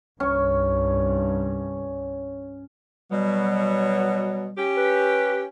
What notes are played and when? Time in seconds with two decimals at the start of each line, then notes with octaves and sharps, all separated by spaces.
0.20 C2 G2 C#4 C#6
3.12 B2 F#3 G3
4.57 C#4 G4
4.77 B4